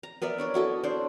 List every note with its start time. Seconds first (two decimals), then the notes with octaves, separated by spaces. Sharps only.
0.03 A#5
0.22 B3 A#4 D5 E5
0.38 D4 C#5 D5
0.54 E4 F#4 A4 D#5
0.84 D4 C5